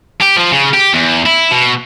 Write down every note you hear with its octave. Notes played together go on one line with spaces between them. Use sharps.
G4
F3
C#3
G4
E2
E4
B2